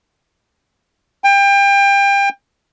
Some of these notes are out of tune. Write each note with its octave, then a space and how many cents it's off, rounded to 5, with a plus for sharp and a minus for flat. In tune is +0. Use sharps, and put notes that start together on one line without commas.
G5 +30